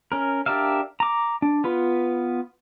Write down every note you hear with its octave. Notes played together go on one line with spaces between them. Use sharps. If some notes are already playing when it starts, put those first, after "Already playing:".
C#4 A#4
D4 G4 A#4 E5 F5
A#5 D6
D4
B3 F4 B4